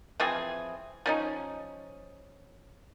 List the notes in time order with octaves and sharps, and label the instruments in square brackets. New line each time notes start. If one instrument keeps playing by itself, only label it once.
[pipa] E3 F3 C4 G#4
F3 C#4 D#4